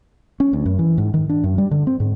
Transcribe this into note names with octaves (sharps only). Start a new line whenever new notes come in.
C#4
D2
F#2
E3
G#2
D#3
D4
F#2
G3
D3
C4
G#2